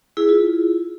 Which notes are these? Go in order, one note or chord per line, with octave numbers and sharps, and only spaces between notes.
E4 G#4
F4